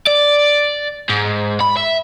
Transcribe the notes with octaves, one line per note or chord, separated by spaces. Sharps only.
D5
G#2
B5
E5